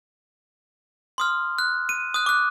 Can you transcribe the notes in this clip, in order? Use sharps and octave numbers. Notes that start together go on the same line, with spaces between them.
C6 D#6 F6
F#6
D#7
D#6 F#6
D6 F#6